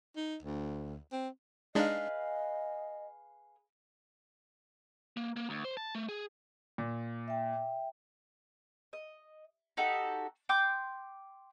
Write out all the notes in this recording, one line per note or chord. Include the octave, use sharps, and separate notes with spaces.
D#4
D2
C4
G#3 D4 D#4 G#4 B4 D#5 F5
A#3
A#3
D2
C5
A5
A3
G#4
A#2
E5 G5
D#5
D#4 F#4 G4 A4
G5 C6 D6 G6